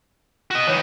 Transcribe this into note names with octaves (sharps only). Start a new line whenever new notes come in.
F#4 D#5
E3 D#4 C#5